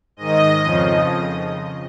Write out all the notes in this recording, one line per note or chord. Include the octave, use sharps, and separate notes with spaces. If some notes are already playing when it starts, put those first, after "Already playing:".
G#2 D#3 D#5
F2 C#3 F3